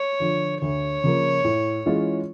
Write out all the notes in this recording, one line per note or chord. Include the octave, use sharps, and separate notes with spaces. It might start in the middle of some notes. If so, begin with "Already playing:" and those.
Already playing: C#5
D3 F3
D2 C#5
C#3 F3 A#3
A2
E3 G#3 C#4 F4